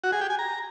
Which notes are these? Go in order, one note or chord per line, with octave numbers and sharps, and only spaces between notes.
F#4
G#4
G4
G#5
A#5